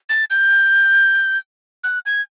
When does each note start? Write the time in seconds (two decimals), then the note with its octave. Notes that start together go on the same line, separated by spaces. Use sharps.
0.09 A6
0.30 G6
1.84 F#6
2.06 G#6